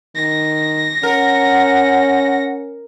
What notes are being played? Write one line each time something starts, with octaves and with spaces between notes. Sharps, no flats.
D#3 A#6
C#4 A#4 F#5